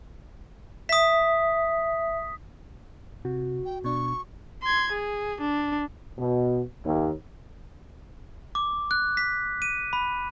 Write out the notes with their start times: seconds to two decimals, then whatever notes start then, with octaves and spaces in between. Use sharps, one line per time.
0.89 E5 D#6 B6
3.25 C3 F#4
3.65 G5
3.84 B2 D4 C#6
4.63 C6 G#6
4.92 G#4
5.41 D4
6.18 B2
6.84 D#2
8.55 D6
8.91 F#6
9.17 B6
9.62 D#7
9.93 B5